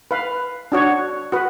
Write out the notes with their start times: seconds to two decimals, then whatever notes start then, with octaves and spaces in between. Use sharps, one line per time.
0.11 B4 F5 B5
0.72 D4 F#4 C#5
1.32 F#4 B4